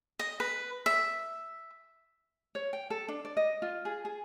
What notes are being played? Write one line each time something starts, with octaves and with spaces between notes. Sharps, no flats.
D#5
B4
E5
C#5
G5
A4
D4
D5
D#5
F4
G#4
G#4